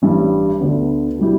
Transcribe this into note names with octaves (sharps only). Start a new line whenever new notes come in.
A1 G2 G3
D2 D3 B3
B2 G3 E4 G4